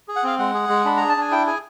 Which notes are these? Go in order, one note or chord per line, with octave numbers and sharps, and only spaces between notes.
G#4
F#5
C4 F5
G#3 F#5
G#4
G#3
D4 B5
G#4 A#5
A5
D4 G#5
E4 G5
G#4 G#5